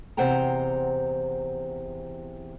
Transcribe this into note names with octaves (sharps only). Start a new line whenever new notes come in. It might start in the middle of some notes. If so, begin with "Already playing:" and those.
E2 C3 C5 F#5 G5 A#5